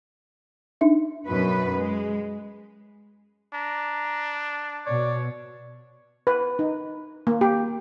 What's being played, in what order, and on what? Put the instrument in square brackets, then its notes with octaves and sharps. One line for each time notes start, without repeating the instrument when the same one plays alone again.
[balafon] D4 D#4 E5
[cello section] F#2 B2 B4
G#3
[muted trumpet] D4 [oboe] A#5
[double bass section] B2 [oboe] C#5 [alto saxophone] D5
[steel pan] B4
D#4
A#3
G4